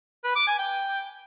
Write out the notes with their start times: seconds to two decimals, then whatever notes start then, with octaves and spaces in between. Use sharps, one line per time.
0.24 B4
0.36 D6
0.47 G#5
0.59 G5